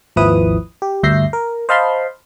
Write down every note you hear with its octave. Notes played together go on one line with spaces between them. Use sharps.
G#1 D#2 F3 E4 B4 D#6
G4
D2 G2 E5 G6 A#6 C7
A#4
C5 D#5 F5 A5 B5 C6